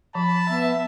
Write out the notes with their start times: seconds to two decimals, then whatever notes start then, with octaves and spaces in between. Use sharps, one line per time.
0.15 F3 A5 B5
0.50 B3 E5